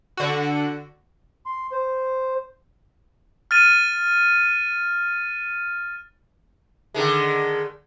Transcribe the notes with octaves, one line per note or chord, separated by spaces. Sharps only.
D3 F#4
C6
C5
F6 A6 D#7
D3 D#3 G#3